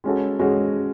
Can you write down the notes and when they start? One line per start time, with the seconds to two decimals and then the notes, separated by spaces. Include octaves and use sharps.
0.04 G#3 C#4 F#4 A4
0.39 G#3 C#4 F#4 A4